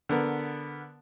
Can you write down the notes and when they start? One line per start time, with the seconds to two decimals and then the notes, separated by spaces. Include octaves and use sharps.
0.09 D3 B3 A#4